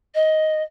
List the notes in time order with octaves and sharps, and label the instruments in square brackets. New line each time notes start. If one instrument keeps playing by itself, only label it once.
[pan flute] D#5